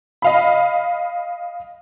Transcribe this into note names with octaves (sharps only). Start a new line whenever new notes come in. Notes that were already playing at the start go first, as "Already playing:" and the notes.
D#5 F5 B5